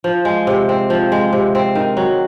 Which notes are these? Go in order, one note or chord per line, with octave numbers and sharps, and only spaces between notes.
F3
G#3
C3
C4
F3
G#3
C3
C4
D#3
F#3